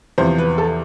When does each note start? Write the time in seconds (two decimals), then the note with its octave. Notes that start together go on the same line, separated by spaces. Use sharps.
0.18 E2 C3 F3 C5
0.38 B4
0.58 A4